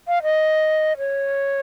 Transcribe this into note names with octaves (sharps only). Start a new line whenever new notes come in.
F5
D#5
C#5